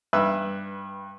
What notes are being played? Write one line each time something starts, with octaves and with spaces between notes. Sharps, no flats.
G2 B4 E5 E6